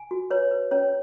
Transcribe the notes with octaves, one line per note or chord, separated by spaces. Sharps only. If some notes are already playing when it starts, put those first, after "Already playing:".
Already playing: G#5
F#4
B4 C#5
B4
C#4 C#5